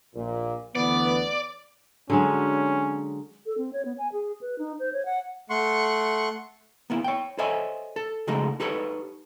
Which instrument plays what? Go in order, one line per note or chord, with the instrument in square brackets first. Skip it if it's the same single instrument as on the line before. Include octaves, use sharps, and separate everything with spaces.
[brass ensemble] A#1 A#2
[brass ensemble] D2 E3 B4 [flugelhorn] B3 [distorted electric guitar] D5
[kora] D3 F#3 G#3 [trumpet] C#4
[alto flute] A4
C4
C#5
B3
G#5
G#4
B4
D#4
C5
C#5
F#5
[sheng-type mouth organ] A3 F#5 C6 C#6
[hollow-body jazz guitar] A#3 B3 E4
C#5 G5
A4 C5 C#5 D#5 E5 G#5
A4
C#3 F3 G#3 A3 D#4 F#4
D#4 G4 A4 B4 C#5